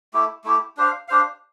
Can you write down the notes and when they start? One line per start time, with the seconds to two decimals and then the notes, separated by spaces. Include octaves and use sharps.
0.14 A3 E4 G4
0.44 A3 E4 G4
0.77 D4 G4 C5 F5
1.08 D4 G4 C5 F5